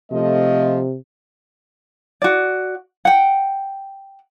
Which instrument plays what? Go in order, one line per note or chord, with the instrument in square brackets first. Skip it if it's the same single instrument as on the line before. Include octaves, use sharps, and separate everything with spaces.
[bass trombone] C3 [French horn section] F3 A3 D#5
[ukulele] F#4 D5
F#5 G5